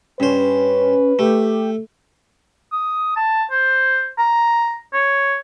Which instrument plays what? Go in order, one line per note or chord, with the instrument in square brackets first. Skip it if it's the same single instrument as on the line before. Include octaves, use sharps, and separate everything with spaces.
[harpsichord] G2 C5 [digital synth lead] C#4 [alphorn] B4
[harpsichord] A3 [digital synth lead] G4
[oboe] D#6
A5
C5
A#5
C#5